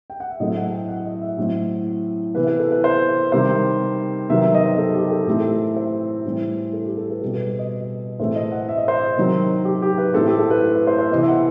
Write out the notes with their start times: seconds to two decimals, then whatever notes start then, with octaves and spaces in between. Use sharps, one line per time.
0.10 G5
0.20 F#5
0.31 E5
0.40 A2 F#3 A3 C4 D#5
0.57 F#5
0.72 G5
0.88 F#5
1.06 D#5
1.21 E5
1.38 A2 F#3 C4
2.35 C3 E3 B3 B4
2.47 B4
2.59 A4
2.71 B4
2.84 C5
3.32 C3 D#3 G3 C4 C5
4.29 C3 D#3 F#3 B3 E5
4.42 E5
4.54 D#5
4.66 C5
4.78 A4
4.95 G4
5.11 A4
5.27 A2 E3 A3 C4 G4
5.40 A4
5.51 G4
5.76 C5
6.25 A2 E3 G3 C4
6.73 A4
6.85 G4
6.97 A4
7.10 B4
7.22 B2 G3 C4 A4
7.34 B4
7.59 D#5
8.19 A2 E3 A3 C4 C5
8.35 D#5
8.52 F#5
8.69 E5
8.77 D#5
8.88 C5
8.97 D#5
9.17 C3 D#3 F#3 C4
9.65 G4
9.82 G4
9.98 B4
10.14 A2 E3 A3 C4 A4
10.27 G4
10.39 A4
10.50 B4
10.63 A4
10.75 B4
10.87 C5
10.99 C5
11.11 C3 E3 B3 D#5
11.23 E5
11.28 F#5